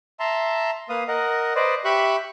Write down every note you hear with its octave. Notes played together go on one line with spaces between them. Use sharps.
E5 A5 A#5 C6
A#3 B4 F5 D#6
A#4 D#5 F#5
B4 C5 D5 D#5
G4 E5 B5 C#6 F#6